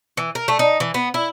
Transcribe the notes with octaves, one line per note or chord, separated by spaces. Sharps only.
E3
A#4
A3
D#4
E3
B3
E4